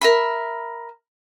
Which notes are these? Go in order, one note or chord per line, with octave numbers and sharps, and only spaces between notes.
A#4 E5 B5